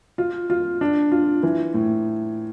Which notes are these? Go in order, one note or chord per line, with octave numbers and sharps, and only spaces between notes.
F4
F4
D4
F4
E3
A2